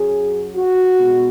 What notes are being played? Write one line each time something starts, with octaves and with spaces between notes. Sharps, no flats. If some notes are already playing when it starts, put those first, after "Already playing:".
Already playing: F#2 F#3 G#4
F#4
B2 G#3